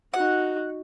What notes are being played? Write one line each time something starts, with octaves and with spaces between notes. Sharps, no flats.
D#4 F#4 F#5